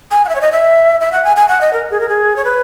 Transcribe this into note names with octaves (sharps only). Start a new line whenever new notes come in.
G#5
F#5
E5
C#5
D#5
E5
E5
F#5
G#5
G#5
F#5
D#5
A#4
G#4
A#4
G#4
C#5
B4